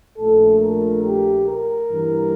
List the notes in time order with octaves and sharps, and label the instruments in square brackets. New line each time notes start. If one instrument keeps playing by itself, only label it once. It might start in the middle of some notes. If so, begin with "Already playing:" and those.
[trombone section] A#1 A#2 A3 A4
A#4
G4
A#4
G2 E3 A#3